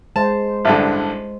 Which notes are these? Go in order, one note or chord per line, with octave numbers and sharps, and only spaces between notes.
G#3 C5 A5
A1 G2 D3